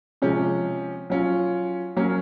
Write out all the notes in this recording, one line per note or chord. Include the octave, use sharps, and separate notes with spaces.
C3 F3 G#3 C#4
F#3 C#4 F4
F#3 A#3 C#4